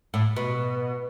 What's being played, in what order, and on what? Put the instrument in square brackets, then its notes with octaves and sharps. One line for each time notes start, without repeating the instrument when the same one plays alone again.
[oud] A2
B2